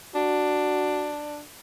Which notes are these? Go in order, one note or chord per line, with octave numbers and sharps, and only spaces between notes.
D4 F#4